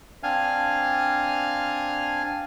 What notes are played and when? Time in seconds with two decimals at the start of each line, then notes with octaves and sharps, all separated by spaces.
0.23 C4 D4 F5 G#5 F6